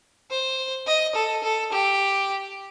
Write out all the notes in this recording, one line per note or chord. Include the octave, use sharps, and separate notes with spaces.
C5
D#5
A4
A4
G4